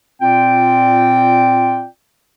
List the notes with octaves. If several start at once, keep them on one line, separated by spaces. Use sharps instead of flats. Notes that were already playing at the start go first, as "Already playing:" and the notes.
A#2 C4 F4 D5 G5